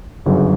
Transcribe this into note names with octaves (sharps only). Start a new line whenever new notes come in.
G1 F#2 C#3 F#3